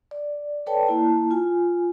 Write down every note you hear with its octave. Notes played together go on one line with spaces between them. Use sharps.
D5
A4 B4 C#5 D5 G5 A5
A#3 E4 A5
F4 G#5